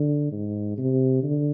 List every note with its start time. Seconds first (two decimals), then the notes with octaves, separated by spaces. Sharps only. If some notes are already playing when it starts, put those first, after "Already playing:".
Already playing: D3
0.32 G#2
0.78 C3
1.23 D3